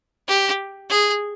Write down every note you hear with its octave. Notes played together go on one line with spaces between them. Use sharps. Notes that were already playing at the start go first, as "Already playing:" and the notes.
G4
G#4